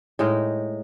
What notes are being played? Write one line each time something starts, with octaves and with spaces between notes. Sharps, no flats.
A2 G#3 D#4 A#4